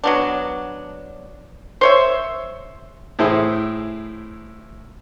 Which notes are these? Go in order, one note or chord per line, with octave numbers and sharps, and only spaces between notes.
F#3 B3 D4
C5 C#5 E5
A2 E4 G#4 C5